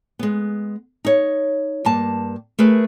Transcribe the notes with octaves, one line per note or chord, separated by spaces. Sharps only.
G#3 B3
D#4 C#5
G2 A#3 A5
A3 G#4 A#4 B4